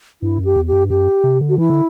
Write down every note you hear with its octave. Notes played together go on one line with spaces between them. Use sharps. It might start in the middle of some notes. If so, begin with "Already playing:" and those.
G2 E4
F#2
G4
E2
G4
F#2
G2
F#2 G4
C3
D3
F#4
E3 E4
D3